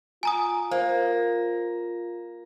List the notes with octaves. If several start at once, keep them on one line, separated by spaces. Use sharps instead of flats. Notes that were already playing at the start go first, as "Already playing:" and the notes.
F4 G#5 A#5 D#6
A#3 C5